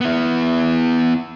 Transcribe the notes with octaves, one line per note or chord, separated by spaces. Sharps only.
B3 E4